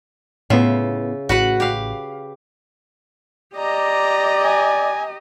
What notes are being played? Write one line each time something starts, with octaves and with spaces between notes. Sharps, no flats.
A2 C#3 B3 F4 E5
A1 F#4 B4 F#5
G4 F5
G4 D5 D#5 A#5
G#5